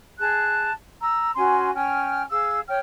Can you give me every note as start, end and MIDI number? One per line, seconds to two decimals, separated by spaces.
0.19 0.71 68
0.19 0.71 81
0.19 0.71 90
0.99 1.30 82
0.99 1.30 88
1.35 1.69 61
1.35 1.69 66
1.35 1.69 80
1.35 1.69 84
1.74 2.22 61
1.74 2.22 79
1.74 2.22 89
2.30 2.60 68
2.30 2.60 77
2.30 2.60 88
2.68 2.79 73
2.68 2.79 79
2.68 2.79 89